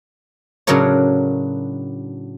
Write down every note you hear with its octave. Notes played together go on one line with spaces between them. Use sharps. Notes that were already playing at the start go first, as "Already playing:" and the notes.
A2 C#3 F#3 D4 A#4 C#5